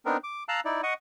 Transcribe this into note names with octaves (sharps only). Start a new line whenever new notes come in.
B3 C4 D4 D#4 A#4
D6
F5 A5 A#5 E6 F#6
D#4 E4 D5
D#5 F#5 C#6 D#6